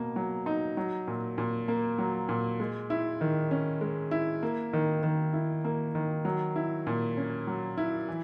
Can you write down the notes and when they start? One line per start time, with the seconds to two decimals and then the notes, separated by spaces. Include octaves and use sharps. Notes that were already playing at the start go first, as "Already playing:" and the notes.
Already playing: B2 A#3
0.16 F#3
0.46 D#4
0.77 F#3
1.07 A#2
1.38 A#2
1.68 A#3
1.98 F#3
2.29 A#2
2.60 G#3
2.90 E4
3.21 D#3
3.51 C#4
3.81 G#3
4.11 E4
4.43 A#3
4.73 D#3
5.03 D#3
5.33 E4
5.64 A#3
5.95 D#3
6.25 F#3
6.56 E4
6.87 A#2
7.17 C#4
7.47 F#3
7.77 E4
8.08 E3